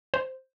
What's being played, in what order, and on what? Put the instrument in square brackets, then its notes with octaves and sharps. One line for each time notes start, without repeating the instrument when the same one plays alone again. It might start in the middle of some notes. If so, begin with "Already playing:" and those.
[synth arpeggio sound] C5